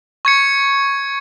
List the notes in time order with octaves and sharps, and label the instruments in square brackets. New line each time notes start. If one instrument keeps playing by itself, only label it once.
[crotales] C#6 G#6 C#7